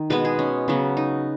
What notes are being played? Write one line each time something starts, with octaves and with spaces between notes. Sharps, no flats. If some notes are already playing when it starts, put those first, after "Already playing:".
Already playing: D#3
B2 G#3 B3 B4
G#4
C#4
C#3 F#3 B3
D#4